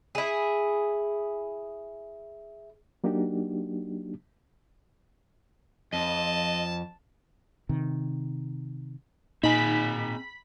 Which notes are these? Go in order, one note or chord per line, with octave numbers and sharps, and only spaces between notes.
E4 G#4
F#3 A#3 D4 D#4 F#4 G4
F2 D#5 A5
C3 D#3
A#2 C4 D#4 G#4 G#5 B5 B6